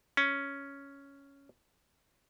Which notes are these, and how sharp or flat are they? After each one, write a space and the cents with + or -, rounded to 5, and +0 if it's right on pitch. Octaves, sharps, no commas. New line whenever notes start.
C#4 +5